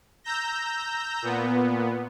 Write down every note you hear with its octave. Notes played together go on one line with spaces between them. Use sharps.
A#5 E6 G6 A#6
A#2 B3